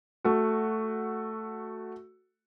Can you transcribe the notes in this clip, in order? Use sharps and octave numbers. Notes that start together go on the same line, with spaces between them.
A3 F#4